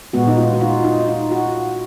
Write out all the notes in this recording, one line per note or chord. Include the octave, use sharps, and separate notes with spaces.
A#2 G#3 B3 F#4
D#4
F4
F#4
F4
D#4
F4
F#4